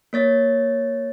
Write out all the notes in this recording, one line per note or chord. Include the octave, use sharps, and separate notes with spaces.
A#3 C#5 A6